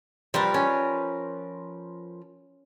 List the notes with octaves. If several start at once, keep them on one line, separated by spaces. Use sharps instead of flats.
F3 G3 A#4 B4
C#4